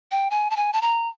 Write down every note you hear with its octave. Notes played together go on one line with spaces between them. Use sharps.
G5
G#5
A5
G#5
A5
A#5